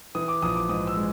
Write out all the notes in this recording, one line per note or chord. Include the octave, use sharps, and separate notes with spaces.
E3 D#6
D6
A#1 D#6
D6
G#2 D#6
E6
G#3